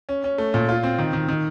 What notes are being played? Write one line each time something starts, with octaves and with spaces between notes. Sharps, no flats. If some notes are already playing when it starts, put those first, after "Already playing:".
C#4
C#4
A3
A#2
F4
C4
D#3
D#3
D#3